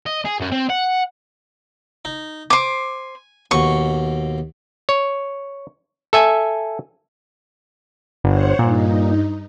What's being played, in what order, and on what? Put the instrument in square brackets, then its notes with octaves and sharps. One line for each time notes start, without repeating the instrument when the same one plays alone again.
[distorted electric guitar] D#5
G#4
F#2
C4
F#5
[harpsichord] D#4
[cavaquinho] C5 D6 [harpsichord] G#5
[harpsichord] D#2 B2 [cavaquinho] C#6
[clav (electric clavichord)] C#5
A4 E5 G#5
[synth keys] G1 [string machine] C5 C#5 F#5
[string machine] G2 D#4 [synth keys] A#2